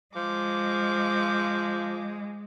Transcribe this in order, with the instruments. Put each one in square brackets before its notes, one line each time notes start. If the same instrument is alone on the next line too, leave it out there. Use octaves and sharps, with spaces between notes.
[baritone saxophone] F3 [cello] G#3 [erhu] D6